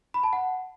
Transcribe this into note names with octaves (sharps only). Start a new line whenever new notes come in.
B5
A5
F#5